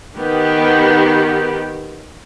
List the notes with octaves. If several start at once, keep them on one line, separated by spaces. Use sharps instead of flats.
D#3 B3 G4